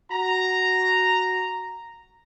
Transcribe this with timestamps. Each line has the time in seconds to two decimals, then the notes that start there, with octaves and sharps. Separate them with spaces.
0.11 F#4 A#5